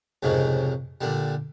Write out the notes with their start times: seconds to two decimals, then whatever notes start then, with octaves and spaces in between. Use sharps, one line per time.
0.23 C2 F2 G#2 C#3
1.01 A#2 D3 G3